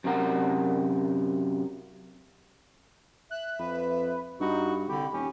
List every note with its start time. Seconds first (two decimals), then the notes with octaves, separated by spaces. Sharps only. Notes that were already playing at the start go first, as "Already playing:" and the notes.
0.04 F#2 C3 A#4 F#5
3.31 E5 F#6
3.59 F2 B4
4.40 G2 D#4 F#4 B5
4.88 C2 D3 G4 B5
5.13 D#1 C#4 G4